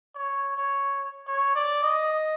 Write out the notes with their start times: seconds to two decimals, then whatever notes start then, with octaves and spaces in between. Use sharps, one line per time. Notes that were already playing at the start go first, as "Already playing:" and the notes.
0.15 C#5
0.57 C#5
1.27 C#5
1.55 D5
1.83 D#5